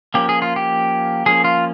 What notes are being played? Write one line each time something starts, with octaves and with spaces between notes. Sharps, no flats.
F3 A#3 C#4 G4
G#4
F4
G4
F3 A#3 C#4 G#4
F4